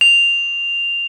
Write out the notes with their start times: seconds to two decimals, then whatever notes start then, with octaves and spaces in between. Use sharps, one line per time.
0.01 F7